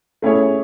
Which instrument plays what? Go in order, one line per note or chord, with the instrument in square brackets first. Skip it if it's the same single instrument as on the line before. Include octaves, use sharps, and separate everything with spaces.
[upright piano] A3 C#4 E4 G#4 C#5